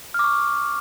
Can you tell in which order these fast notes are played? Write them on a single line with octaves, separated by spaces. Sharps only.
F6 D6 C#6